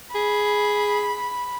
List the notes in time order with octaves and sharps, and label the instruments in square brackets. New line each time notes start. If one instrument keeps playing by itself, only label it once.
[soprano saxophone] G#4 [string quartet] B5